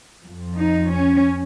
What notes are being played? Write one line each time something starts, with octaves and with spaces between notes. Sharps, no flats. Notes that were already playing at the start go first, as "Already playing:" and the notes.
F2 F3
D#4
C#4